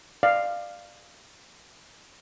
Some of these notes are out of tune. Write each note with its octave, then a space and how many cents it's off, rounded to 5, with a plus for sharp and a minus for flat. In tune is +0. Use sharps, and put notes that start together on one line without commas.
D5 +25 F5 +0